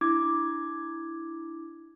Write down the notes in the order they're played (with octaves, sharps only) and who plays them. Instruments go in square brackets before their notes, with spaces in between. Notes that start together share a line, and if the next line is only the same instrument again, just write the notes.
[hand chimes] D4 E4 D6 G#6